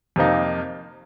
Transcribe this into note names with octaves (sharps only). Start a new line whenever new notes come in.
F2 C3 F3 A#3 D#4